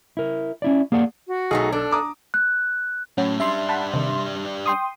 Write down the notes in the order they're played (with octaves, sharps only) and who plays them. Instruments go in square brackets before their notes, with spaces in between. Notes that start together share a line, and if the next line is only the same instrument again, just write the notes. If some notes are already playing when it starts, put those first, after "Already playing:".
[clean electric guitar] E4 A#4
C#4 E4 D5
A#3 G#4 D5 F#5
[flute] F#4
[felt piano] B1 [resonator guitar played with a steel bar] A3 D#4 G#4
[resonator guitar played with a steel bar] D4 [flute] A4
[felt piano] A#5 D6 D#6
[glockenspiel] F#6
[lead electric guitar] A2 [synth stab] F#3 [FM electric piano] C#4
[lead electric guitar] G3 D4 [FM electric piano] E5 C6
[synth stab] F#5 A5 B5
C3 D#3
[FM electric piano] G5 C6 D#6